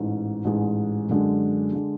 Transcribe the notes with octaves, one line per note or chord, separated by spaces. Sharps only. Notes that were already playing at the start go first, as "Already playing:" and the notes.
Already playing: A1 G#2 G#3
A1 G#2 G#3
F#2 D3 G#3
D3 G#3